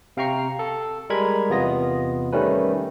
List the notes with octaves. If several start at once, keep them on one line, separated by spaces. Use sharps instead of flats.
C3 F5 G5 A#5 C#6 C7
A4
G3 G#3 A#4 B5 G#6
E2 C3 B3 F4 D#5 A#6
D#3 G3 A3 C#4 B4